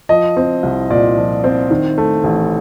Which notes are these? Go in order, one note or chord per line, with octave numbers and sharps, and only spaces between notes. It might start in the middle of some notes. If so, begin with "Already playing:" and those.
F3 D#5
C4
C2
A#2 D5
F3
C4
D#3
A3
A1